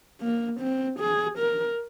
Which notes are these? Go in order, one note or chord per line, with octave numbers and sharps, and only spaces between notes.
A#3
C4
G#4
A#4